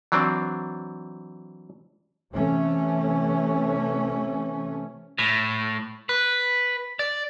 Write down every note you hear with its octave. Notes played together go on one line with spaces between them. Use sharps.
E3 F#3 C4 D4
C3 E3 A3 C#4
A2
B4
D5